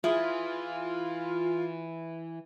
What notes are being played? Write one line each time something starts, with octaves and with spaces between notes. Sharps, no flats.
E3 E4 F4 G#4